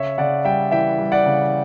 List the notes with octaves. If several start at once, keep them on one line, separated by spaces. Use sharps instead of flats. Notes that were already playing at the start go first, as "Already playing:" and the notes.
Already playing: C#3 C#5 E5
C#3 D5 F#5
G3 E5 G5
E3 E5 G5
G3
D5 F#5
C#3